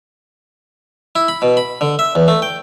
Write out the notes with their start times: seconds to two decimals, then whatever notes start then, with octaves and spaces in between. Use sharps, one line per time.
1.16 E4
1.28 B5
1.42 B2
1.57 B5
1.81 D3
1.99 E5
2.15 E2
2.28 A3
2.42 G5